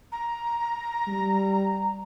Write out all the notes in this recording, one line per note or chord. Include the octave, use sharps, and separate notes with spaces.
A#5
G3